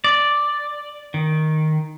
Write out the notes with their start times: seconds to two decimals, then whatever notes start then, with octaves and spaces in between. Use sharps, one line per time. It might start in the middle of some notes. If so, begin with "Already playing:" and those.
0.04 D5
1.14 D#3